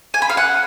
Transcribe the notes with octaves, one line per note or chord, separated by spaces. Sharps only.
G#5
B5
F5
F#5